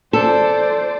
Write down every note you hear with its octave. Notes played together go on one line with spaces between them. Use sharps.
A4 C5 D5